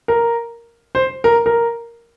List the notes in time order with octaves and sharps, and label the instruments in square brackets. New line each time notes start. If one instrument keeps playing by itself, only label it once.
[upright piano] A#4
C5
A#4
A#4